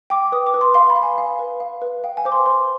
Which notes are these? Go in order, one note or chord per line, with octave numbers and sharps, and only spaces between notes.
G5 D6
B4 D#6
D6
B4
C6
F5 C6
B5
F5
G#5
F5
B4
F5
B4
F5 G5
G#5
C5 D6
C6
C5 C6